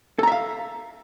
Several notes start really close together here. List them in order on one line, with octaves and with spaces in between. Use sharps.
A4 A#5 E5 F5